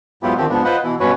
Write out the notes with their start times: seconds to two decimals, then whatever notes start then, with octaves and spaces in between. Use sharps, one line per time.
0.23 G#2 F#3 B3 E4 F4 G4
0.37 D3 D#3 F3 C4 G4
0.49 G#2 F3 B3 D4
0.65 F4 B4 C5 D#5 F#5
0.84 B2 E3 E4
1.00 G2 B2 C#4 F#4 B4 C#5